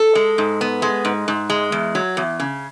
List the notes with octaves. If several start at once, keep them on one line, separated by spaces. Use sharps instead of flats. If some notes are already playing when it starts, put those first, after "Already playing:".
Already playing: A4
G#3
G#2
B3
G#3
G#2
G#2
G#3
E2
F#3
E2
C#3